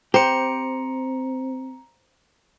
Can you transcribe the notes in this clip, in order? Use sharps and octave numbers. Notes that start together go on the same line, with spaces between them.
C4 G4 C5 A#5 C#7